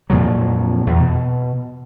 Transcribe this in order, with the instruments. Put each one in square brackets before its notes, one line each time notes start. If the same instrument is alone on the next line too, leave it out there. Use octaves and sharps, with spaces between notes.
[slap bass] F2 A#2 F3 F#3
E2
B2